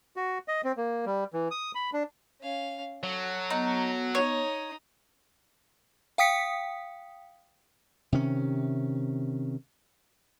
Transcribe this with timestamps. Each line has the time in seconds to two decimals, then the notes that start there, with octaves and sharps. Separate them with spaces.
0.16 F#4
0.48 D#5
0.64 C4
0.77 A#3
1.06 G3
1.33 E3
1.51 D#6
1.75 B5
1.93 D4
2.41 C#4 F5
3.03 F#3 A4
3.50 B3 D#4
4.15 D#4 C#5 D#6
6.18 F5 G5 D#6 B6 C#7
8.12 C3 D#3 C#4